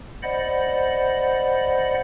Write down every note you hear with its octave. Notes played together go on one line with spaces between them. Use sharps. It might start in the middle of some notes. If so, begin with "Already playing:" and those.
C5 D5 D#5 F#5 B5